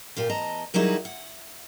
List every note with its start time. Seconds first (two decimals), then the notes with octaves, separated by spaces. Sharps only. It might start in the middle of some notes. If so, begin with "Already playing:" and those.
0.17 A#2 F4 G4
0.30 E2 D#5 A5 A#5
0.74 D#3 F#3 G3 D#4 E4 G#4
1.05 F#5